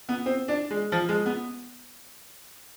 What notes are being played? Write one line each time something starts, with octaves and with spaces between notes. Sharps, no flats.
B3
C4
D4
G#3
F3
G#3
B3